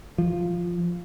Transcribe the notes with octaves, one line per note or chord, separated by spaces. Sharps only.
F3